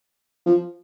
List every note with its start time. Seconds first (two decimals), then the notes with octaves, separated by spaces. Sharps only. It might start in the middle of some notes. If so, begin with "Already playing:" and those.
0.46 F3